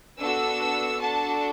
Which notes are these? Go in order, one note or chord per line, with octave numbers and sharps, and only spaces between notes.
B3 D4 F#4 A4 E6
D4 F#4 A4 A5